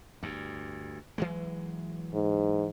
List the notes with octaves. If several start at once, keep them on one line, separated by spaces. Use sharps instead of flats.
D2 G2
E3 F#3 G#3
G#2